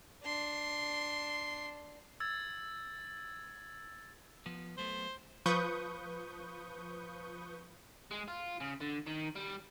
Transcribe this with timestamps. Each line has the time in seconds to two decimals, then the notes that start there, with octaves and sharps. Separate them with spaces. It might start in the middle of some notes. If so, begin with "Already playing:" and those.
0.24 D4 C6
2.20 E6 G#6 A6
4.46 F3 B3
4.78 F#3 A3 B3 C5
5.46 F3 B4 C#6 D#6 G6
8.11 G#3
8.28 F4
8.61 C#3
8.81 D3
9.07 D#3
9.36 G3